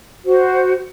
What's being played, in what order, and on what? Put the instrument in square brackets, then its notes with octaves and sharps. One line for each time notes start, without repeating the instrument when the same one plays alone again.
[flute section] F#4 C5